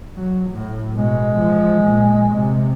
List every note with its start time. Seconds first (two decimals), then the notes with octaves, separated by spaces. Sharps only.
0.16 F#3
0.51 A2
0.96 B2 G#3
1.39 F3
1.83 A#2
2.33 C3